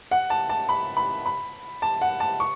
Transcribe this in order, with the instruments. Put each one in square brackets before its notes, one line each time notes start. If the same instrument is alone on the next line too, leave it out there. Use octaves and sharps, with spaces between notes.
[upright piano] F#5
A5
A5
B5
B5
B5
A5
F#5
A5
C#6